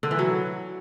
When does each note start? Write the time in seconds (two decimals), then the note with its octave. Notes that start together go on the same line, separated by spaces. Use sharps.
0.03 D3
0.11 E3
0.19 F#3